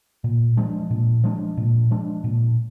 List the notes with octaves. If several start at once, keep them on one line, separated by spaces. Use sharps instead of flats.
A#2
F3 G#3 D4
A#2
F3 G#3 D4
A#2
F3 G#3 D4
A#2